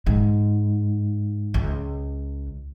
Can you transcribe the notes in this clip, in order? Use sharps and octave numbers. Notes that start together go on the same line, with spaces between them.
G#2
C#2